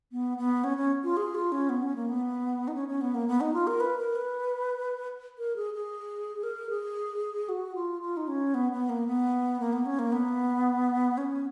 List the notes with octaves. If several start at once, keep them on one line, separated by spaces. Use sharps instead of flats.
B3
B3
C#4
C#4
F4
G#4
F4
C#4
B3
C#4
A#3
B3
D#4
C#4
C#4
B3
A#3
B3
D#4
F4
A#4
B4
A#4
B4
A#4
G#4
G#4
A#4
G#4
F#4
F4
F4
D#4
C#4
B3
B3
A#3
B3
A#3
B3
C#4
A#3
B3
C#4